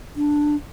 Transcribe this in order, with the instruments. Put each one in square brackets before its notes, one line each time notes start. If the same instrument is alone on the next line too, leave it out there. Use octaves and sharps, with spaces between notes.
[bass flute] D4